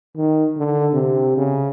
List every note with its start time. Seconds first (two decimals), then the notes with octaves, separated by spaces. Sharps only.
0.17 D#3
0.57 D3
0.93 C3
1.37 C#3